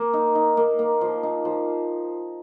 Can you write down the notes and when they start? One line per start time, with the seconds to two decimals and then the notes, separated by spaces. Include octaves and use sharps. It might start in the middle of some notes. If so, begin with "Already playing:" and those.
Already playing: A#3
0.14 D#4
0.35 D#4
0.57 A#3
0.79 A#3
1.01 F3
1.23 D#4
1.45 F3